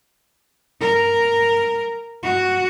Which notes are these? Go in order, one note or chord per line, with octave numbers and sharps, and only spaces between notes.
A#4
F#4